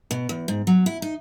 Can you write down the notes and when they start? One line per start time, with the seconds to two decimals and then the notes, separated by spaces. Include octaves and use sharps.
0.11 B2
0.29 E2
0.48 G#2
0.67 F#3
0.86 E4
1.02 D#4